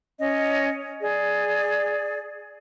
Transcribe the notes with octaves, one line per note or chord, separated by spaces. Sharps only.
C#4 D#5
G#4 D5